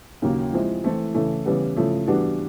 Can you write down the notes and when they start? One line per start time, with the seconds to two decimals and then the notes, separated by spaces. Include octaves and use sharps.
0.22 D#2 C#3 F#3 A#3
0.53 F3 G#3 C4 E4
0.84 E3 A3 C4 E4 A4
1.15 C#3 E3 A3
1.46 C#3 E3 G3 B3
1.77 C#3 F3 A3
2.07 E3 G3 B3 D4 F#4